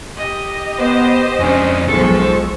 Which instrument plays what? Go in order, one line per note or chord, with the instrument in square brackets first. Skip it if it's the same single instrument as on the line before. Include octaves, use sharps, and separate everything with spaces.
[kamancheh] G4 D#5
[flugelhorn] B3 [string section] C5
[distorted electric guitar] F2 D4 [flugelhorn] C#4
[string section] B1 F3 [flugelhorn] G#3 [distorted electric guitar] A4 [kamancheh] C#6